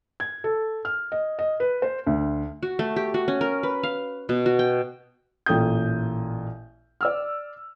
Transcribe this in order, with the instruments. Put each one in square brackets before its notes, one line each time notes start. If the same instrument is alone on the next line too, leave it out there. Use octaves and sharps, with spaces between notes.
[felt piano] G#6
A4
F6
D#5
D#5
B4
C5
D2
[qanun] F#4
A3
G4
F#4
C#4
A#4
B4
F5
B2
F#4
G5
[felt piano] A1 A#2 A4 G5 D#6 G6
D5 E6 F6